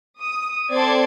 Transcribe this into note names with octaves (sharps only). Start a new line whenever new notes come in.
D#6
C4 A4 D5 C6 D6 G#6